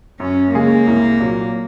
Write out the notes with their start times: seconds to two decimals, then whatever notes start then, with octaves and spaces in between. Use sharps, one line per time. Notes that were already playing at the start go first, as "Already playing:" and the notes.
0.20 F#2 C#4
0.53 C#3 G#3 A#3 C#4 G#4
0.87 C2
1.20 A#2 F#3